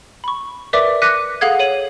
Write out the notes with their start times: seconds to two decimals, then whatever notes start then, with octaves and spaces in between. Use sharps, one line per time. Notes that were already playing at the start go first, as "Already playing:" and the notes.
0.24 B5 C#6
0.73 A#4 B4 D5 E5 D6 B6
1.02 D6 F#6 A#6 B6 C#7 D#7
1.41 G#4 A4 F5 F#5 D#6 G#6
1.59 C#5 D#7 F#7